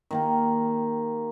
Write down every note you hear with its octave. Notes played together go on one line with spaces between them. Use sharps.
D#3 A#3 G4